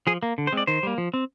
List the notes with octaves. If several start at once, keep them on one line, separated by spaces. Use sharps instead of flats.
F3 G#4
A#3
D3
C5
G#3 C4 D5
D#3 C5
G3 A#3
F3
C4